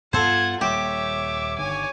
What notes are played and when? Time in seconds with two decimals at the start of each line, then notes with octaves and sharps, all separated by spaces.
0.13 G2 B3 F4 A4 C5 F#5 G#6
0.61 D#1 G3 A#3 G4 C#5 E5 D6
1.58 G1 D3 D#3 C#5 G#5